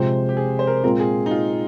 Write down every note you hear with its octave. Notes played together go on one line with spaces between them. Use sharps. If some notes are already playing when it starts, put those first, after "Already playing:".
Already playing: C3 F3 G#3 C5
G4
G#4
C5
A#4
A#2 G#3 C4 F4 A#4
G#4
D#4
F4